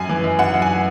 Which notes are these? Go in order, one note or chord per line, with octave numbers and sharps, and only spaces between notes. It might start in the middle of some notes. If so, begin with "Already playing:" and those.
Already playing: F#2 G#5
E3
F#2
F#2 F#5
F#2
G#5